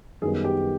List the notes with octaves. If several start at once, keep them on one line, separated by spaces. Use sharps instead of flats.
F#2 D#3 G3 B3 G#4
G4